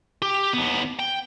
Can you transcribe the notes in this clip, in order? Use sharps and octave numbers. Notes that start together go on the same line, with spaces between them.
G4
D#2 B3
G5